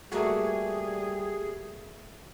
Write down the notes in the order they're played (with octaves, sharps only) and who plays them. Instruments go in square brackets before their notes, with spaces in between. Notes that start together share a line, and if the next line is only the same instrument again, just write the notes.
[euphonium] G3 [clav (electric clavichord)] A3 A#3 F#4 [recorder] G#4